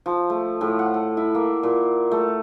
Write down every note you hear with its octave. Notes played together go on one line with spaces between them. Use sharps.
F3
A3
A2
F#5
A4
E4
A#3
A#2
A3